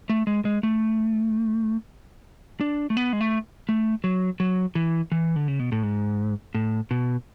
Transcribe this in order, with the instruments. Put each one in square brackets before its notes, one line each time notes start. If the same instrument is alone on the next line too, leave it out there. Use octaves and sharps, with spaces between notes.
[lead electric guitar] A3
G#3
G#3
A3
D4
A3
B3
G#3
A3
A3
F#3
F#3
E3
E3
D3
C#3
B2
A2
G#2
A2
B2